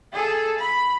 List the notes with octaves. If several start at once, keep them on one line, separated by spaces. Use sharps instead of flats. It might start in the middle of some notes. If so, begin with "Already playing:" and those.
G#4 A4
B5